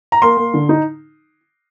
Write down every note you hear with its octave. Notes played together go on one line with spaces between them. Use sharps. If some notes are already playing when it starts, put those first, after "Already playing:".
A#5
A#3 C6
A#3
D3
D#4